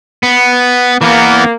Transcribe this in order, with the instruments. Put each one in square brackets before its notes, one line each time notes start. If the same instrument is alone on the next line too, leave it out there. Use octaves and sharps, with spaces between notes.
[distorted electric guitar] B3
[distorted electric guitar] E3 B3 [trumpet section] A#3